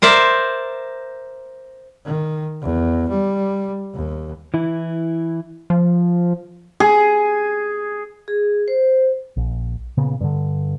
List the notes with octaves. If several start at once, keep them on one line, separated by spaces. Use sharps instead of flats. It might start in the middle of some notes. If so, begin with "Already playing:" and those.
A#4 C5 D5 E5
D#3
E2
G3
D#2
E3 E4
F3
G#4
G#4
C5
A#1
A#2 C#3 B3
G2 D3